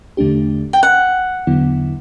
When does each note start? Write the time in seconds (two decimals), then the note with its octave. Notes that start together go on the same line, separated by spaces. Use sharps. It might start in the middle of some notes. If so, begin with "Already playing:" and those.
0.17 E2 D3 A3 D4 G4
0.73 G5
0.83 F#5
1.47 E2 D3 F#3 B3 E4